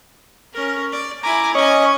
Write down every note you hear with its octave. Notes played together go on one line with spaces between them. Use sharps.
C#4 A#4
D5
E4 G#5 A#5 D6
C#4 C#5 D#5 G#5 C#6